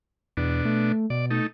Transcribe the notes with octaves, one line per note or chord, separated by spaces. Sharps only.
E2 B2 D4
A3
B2 D5
A3 D#4